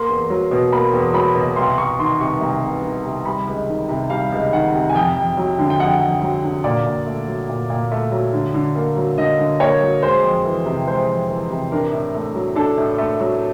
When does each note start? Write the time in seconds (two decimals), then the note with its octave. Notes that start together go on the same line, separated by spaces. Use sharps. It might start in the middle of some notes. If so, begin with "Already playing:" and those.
Already playing: A#3 C6
0.09 E2
0.30 F#3
0.51 B2
0.72 A#3 B5
0.93 E2
1.14 F#3 B5
1.35 B2
1.56 C2 C6
1.77 C2 C#6
1.99 D#3 C6
2.20 C3 C#6
2.41 C2
2.63 C2
2.83 D#3
3.05 C3
3.25 G3 B5
3.47 C#2
3.68 D#3
3.89 C3
4.10 G3 F5
4.32 C#2
4.53 D#3 F#5
4.74 C3
4.89 G#5
4.94 F2 G5
5.16 F2
5.37 F#3
5.59 D3
5.70 G5
5.80 F2 F#5
6.01 F2
6.22 F#3
6.43 D3
6.64 A#2 D5
6.86 A#2
7.06 A3
7.28 F#3
7.49 A#2
7.70 A#2
7.92 A3
8.12 F#3
8.33 D3
8.54 D3
8.75 A#3
8.97 F#3
9.18 D3 D#5
9.39 D3
9.60 A#3 C#5
9.82 F#3
10.02 G#3 C5
10.23 F2
10.45 E3
10.66 C3
10.87 G#3 C5
11.08 F2
11.29 E3
11.50 C3
11.72 D4 A#4
11.93 A2
12.14 A3
12.35 F#3
12.56 D4 A4
12.77 A2
12.98 A3
13.20 F#3